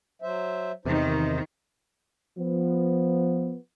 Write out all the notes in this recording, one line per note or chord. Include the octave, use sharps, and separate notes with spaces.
F#3 C5 E5
E2 C3 D#3 D#4 C5
F3 B3